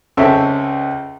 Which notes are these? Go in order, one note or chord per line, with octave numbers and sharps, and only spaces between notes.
C#2 C4 C#4 A4 E5